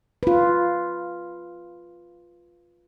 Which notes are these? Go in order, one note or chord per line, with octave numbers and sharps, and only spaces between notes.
F4 B4